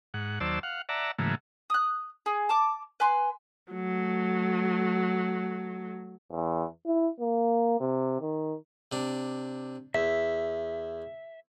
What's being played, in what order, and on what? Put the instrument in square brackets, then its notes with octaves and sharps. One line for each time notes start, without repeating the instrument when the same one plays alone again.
[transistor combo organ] G#2 F#5
D#2 F#3 C5 D5 A5 E6
F5 F#5
D5 E5 F#5 A5 A#5
G#2 C#3 E3 F#3 A3 A#3
[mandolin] D#6 F#6
G#4
A5 D6
B4 G#5 C6
[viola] F#3 A3
[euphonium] E2
E4
A#3
C3
D#3
[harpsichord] C3 D4
[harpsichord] E2 [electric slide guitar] E5